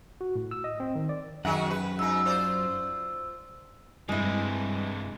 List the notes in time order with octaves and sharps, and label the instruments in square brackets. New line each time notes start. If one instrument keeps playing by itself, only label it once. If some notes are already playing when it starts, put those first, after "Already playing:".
[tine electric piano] F#4
A2
E6
D#5
C4
D#3
D5
[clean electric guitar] F#2 F#5 [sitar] D#3 F#4 G#4
[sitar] B4
[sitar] G#2 D#4 [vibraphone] E6
[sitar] F4 C5 D5
[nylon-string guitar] G2 E4 [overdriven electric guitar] C3 E3 [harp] G#3